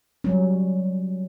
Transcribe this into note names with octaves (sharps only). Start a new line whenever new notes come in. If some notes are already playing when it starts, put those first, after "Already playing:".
F#3 G3 C#4